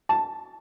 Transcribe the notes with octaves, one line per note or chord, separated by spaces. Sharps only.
A5